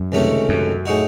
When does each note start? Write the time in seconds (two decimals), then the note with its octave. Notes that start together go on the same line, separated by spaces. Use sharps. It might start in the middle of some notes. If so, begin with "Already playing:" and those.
Already playing: F#2
0.12 C#2 C3 D#3 A3 C#4
0.49 F#2
0.86 A2 G#3 D#4 F#4